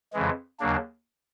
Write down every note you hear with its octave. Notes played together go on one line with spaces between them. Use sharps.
F2 C#3 E3 G#3
D#2 C#3 F#3 A#3 D4